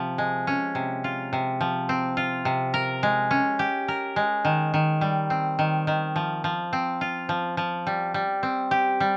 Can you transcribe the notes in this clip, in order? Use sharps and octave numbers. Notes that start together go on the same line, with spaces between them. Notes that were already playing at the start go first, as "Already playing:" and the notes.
Already playing: C3 F3
G#3
C#4
C3
F4
C3
F3
C4
F4
C3
A#4
G#3
C#4
G4
A#4
G#3
D#3
D#3
G3
C4
D#3
D#3
F3
F3
C4
F4
F3
F3
G3
G3
C4
G4
G3